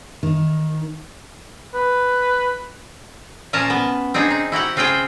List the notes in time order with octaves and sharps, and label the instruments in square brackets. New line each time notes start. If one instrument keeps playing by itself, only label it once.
[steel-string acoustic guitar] D#3
[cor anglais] B4
[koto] A#2 F3 C#4 A#4 A5 A#5
B3
C4 D4 D#4 G#4
D#4
E4 F#4 G4 F#5
C#3 C4 F4 G#4 C5 G5